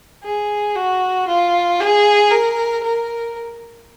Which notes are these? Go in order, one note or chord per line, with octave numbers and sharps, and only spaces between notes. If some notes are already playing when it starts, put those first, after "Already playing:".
G#4
F#4
F4
G#4
A#4
A#4